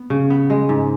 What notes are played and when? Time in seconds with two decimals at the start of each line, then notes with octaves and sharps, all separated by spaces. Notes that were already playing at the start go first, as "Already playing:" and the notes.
Already playing: B3
0.10 C#3
0.30 B3
0.50 G#3
0.69 G#2